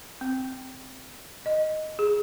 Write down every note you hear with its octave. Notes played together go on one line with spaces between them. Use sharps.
C4
D#5
G#4